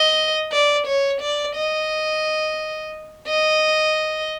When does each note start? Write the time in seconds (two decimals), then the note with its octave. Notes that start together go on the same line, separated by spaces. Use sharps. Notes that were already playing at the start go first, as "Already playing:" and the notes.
Already playing: D#5
0.52 D5
0.86 C#5
1.21 D5
1.55 D#5
3.28 D#5